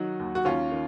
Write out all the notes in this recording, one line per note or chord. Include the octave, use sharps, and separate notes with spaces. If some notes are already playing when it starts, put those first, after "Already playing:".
Already playing: D#3 F#3 D#4 F#4
D#2
F#4
D#2 C#4 F4
D#3